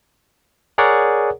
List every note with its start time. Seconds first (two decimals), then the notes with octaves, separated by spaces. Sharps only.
0.78 G#4 A#4 C#5 D5 F#5